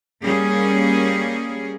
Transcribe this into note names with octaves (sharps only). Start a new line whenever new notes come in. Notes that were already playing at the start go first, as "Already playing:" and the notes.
G3 A#3 C#4 G#4